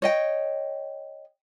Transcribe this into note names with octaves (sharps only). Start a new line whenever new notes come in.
C#5 D#5 G5